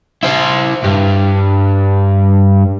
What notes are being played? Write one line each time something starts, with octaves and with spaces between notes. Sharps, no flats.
E4 C5
G2